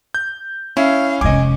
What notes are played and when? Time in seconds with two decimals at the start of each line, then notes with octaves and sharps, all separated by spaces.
0.15 G6
0.77 C#4 E4 F5
1.21 F1 F2 G#3 C#4 D#5 G#5 D6